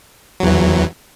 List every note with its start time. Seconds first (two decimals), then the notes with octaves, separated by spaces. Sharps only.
0.40 F#3
0.43 E2
0.46 E3